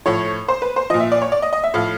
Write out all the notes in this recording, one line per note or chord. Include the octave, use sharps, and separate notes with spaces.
A2 F3 C#5
C5
B4
C5
A#2 F3 D#5
E5
D5
C#5
D5
D#5
D#5
E5
A2 F3 F5